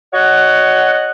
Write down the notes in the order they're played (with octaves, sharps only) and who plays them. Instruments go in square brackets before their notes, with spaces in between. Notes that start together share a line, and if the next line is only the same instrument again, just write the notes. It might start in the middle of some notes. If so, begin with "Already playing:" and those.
[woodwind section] F#4 C#5 D#5 F#5